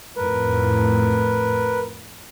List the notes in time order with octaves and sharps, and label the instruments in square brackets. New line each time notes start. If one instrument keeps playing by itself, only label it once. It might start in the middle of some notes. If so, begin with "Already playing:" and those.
[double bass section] F2 A2 [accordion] A#4 B4